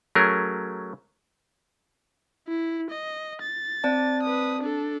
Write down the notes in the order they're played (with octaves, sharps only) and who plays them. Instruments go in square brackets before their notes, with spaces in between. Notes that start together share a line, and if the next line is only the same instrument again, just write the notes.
[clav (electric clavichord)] F#3 A3 C#4 G#4 A#4
[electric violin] E4
D#5
A6
[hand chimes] C4 D5 A5
[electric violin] B4 D#6
D4 A4